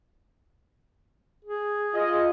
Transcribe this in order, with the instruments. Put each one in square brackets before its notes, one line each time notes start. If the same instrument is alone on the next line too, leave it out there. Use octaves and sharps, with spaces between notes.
[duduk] G#4
[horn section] F4 D#5